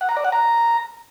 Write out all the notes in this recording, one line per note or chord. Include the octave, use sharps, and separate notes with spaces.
F#5
A#5
D5
F#5
A#5